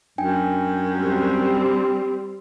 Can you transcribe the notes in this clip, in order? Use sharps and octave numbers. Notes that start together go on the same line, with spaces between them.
F#2 D4 G5 G#5
G3 C4